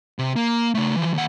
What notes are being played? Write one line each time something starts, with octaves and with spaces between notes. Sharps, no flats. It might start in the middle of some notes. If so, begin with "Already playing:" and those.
C3
A#3
C#3 A3
E3 F3
D#2 F#5